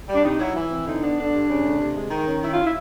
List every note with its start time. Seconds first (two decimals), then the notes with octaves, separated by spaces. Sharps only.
0.09 G3
0.15 D4
0.24 C3 D#4
0.40 F#3 E4
0.55 E3 E4
0.71 C4
0.86 D3 D#4
1.02 B3 D4
1.18 D3 D4
1.34 G2
1.49 C#3
1.64 A3
1.80 C3
1.95 G#3
2.11 D#3
2.26 C#4
2.42 D#3 E4
2.52 F4
2.63 E4